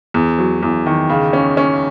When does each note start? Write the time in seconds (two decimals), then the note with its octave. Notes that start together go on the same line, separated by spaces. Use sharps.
0.14 E2
0.38 F#3
0.63 E2
0.86 D#3
1.09 C#3
1.33 C#4
1.57 C#4